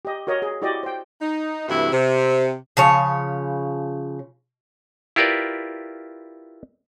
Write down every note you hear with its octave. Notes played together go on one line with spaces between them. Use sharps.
G4 D#5
F#4 A#4 C#5 D#5
G#4
E4 F#4 G4 D5 D#5
C5 G5
D#4
G2 C3 E3 A3 E4 F#4
C3
C#3 F3 C#5
E4 F4 G4 A#4 B4 D5